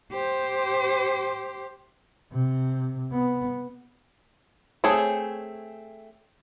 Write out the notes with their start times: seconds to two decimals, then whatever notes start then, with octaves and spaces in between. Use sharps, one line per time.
0.13 G4 C5
2.33 C3
3.13 B3
4.84 A3 C4 G#4 C#5